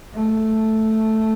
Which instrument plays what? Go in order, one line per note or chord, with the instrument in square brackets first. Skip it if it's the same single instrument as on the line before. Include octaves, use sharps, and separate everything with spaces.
[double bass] A3